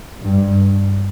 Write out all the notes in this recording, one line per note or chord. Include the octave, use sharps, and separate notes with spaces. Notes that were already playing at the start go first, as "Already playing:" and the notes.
G2